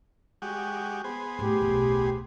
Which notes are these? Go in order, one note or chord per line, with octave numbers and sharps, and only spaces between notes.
G#3 F#4 G4
B3 G#4 C5
A2 F#3 G4
D1 B1